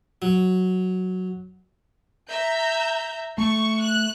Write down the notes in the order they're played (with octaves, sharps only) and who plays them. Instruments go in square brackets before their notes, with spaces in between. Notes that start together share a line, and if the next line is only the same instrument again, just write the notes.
[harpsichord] F#3
[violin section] E5 A#5 G6
[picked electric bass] A3 [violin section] C#6
[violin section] F#6